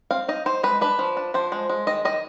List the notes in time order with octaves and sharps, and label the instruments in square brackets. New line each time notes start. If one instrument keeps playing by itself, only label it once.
[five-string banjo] C4 F5
D#4 D#5
D#4 C5
G#3 B4
D4 B4
F3
D4
F3 C5
G#3
G#3
D#3 D#5
D#3 D#5